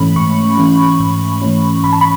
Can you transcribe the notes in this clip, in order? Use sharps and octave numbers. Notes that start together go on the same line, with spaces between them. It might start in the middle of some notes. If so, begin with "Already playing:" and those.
Already playing: G#2 E3 A3 C#4 B5
G#2 C#6
E3 A3 C#4
G#2
E3 A3 C#4
G#2 B5
A5
B5